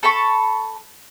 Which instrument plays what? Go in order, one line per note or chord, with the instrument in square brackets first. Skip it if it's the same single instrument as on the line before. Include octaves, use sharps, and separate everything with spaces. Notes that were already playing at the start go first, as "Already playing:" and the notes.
[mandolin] A4 A5 B5 C#6